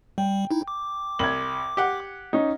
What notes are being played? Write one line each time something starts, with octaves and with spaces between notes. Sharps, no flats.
G3 G5
D#4 E4
D6
C2 G#6 F#7
G4 F#5
C#4 D#4